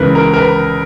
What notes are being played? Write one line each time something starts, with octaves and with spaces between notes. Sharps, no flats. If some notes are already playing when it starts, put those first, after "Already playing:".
Already playing: C#2 C#3 E3 A#4 B4
A#4
A#4
B4